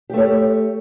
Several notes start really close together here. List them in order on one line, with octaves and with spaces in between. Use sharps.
G4 A3 C#5